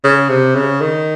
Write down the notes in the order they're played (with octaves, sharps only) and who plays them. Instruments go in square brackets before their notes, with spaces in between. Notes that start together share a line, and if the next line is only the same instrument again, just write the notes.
[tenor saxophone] C#3
C3
C#3
D#3